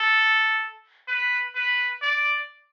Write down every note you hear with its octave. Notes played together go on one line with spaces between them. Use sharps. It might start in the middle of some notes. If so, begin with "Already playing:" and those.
Already playing: A4
B4
B4
D5